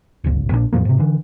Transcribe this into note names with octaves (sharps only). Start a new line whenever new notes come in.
D1 G1 C#2
A#1 A#2 G#3 D4
E2 A2 F3 A#3
G#2 C3
D3 E3